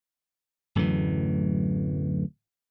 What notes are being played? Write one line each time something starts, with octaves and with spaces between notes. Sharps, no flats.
D1 F#2 A2 E3